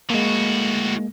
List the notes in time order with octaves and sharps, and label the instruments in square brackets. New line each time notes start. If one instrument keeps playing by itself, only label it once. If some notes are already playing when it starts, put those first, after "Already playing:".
[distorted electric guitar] A2 F#4 [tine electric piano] G#3 A#3